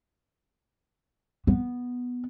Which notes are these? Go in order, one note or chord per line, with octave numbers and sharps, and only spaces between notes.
B3